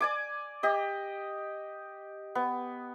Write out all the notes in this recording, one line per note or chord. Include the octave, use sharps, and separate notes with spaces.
D5 G#5 D6
G4 D#5
B3